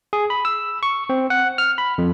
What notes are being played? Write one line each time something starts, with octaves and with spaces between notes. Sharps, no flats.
G#4
B5
E6
C#6
C4
F#5
F6
B5
F2